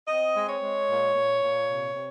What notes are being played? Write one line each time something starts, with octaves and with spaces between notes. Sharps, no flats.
C4 D#5
G#3
C#5
G#3
A#2
A#2
A#2
C3
C3